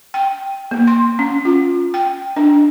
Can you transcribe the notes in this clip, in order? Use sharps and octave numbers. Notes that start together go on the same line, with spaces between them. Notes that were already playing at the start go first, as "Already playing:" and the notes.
G5
A#3
C6
C#4
F4
G5
D4